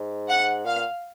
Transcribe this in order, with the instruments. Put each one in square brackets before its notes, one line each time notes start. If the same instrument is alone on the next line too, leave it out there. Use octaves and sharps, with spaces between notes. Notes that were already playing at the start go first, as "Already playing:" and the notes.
Already playing: [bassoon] G#2
[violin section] F#5
[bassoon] A#2 [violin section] F5